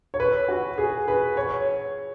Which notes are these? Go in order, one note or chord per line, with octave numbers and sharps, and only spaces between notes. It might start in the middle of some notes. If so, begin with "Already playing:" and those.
C#5
B4
F#4
G#4
B4
C#5